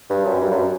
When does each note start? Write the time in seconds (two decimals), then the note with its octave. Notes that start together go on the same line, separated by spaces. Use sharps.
0.10 G2
0.25 F#2
0.41 G2
0.51 F#2